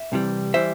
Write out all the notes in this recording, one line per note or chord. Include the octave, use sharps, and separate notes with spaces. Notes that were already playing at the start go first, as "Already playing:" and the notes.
Already playing: E5
C2 C3 E3 G3
E3 G3 C5 E5